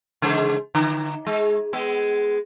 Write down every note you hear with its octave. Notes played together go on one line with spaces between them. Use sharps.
C#3 G#3 C5
D3
G#3
G#3 B3